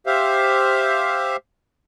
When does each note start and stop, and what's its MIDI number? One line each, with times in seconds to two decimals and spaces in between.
0.06 1.36 67
0.06 1.36 72
0.06 1.36 76
0.06 1.36 77